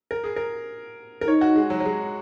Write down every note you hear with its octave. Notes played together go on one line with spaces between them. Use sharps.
A#4
G#4
A#4
A#4
D#4 C#5
F#4
G#3
F#3
F#3
G#3